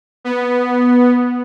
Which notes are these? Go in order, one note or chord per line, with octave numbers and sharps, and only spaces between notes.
B3